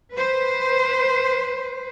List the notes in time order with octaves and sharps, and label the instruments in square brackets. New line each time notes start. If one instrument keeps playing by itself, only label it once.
[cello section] B4 C5